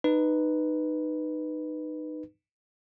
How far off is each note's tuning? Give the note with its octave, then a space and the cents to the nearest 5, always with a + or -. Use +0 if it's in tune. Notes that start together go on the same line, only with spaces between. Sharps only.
D#4 -20 B4 +0